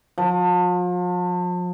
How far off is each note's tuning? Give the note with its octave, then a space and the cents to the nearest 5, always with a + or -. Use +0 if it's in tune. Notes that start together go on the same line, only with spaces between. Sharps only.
F3 +40